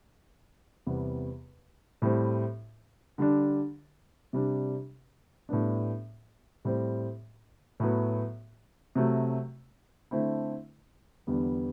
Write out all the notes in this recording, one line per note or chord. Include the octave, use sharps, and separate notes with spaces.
E2 C3 G3 B3
A2 G3 C4 E4
D3 G3 D4
C3 G3 D4
A2 G3 B3 D4
A2 G3 C4
A2 F#3 B3
C3 F#3 A3
D3 A3 C4 E4
E2 D3 G3 B3